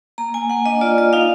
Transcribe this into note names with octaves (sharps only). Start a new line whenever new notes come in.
A#3 A#5
A#3 G#5
A#3 F#5
D4 D#5
F4 D5
F4 D#5
D#4 F5